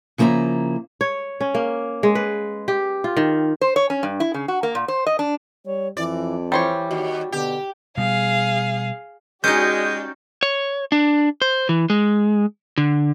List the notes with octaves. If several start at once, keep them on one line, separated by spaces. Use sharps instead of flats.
C#3 F3 A#3 E4 A#5
C#5
C#4
A#3
G#3
B4
G4
F4
D#3
C5
C#5
C#4
G2
E4
C#3
F#4
A#3
A#2
C5
D#5
D4
G3 C#5
F2 E3 D5
E3 G3 C5 C#5
D#2 F#4
B2 D3 G4
B2 G3 G#4 F5
G#3 C#4 D#4 F#4 G4 D5 G6
C#5
D4
C5
E3
G#3
D3